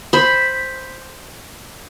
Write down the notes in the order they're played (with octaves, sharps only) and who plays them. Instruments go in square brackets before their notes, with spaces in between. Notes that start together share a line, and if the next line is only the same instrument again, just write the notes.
[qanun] C5 B5